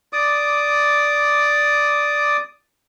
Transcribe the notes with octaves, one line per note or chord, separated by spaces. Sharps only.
D5 D6 D#6